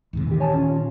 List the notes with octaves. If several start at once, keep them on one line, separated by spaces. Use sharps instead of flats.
D#2 G#2 C3
A#2 D#3 E3 G4
C#5 G#5 A5
C#4 F4